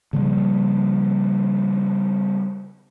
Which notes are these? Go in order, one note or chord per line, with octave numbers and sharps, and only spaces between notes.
C#3 F3 G3 A#3